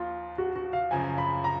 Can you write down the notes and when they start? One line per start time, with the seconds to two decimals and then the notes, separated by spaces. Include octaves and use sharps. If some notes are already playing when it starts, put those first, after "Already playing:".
Already playing: D#2 F3 F4
0.38 F#4
0.56 F#4
0.73 F5
0.91 F#2 C#3 F3 G#5
1.18 B5
1.44 A#5